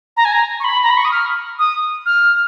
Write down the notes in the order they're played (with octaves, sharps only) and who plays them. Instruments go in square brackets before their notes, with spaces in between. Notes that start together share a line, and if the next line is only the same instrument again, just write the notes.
[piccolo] A#5
G#5
A#5
C#6
B5
A#5
B5
C#6
D#6
F6
D#6
F6